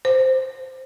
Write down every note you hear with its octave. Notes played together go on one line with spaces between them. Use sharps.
C5